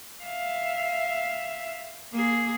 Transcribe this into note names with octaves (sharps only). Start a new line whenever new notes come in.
E5 F5
A#3 G#4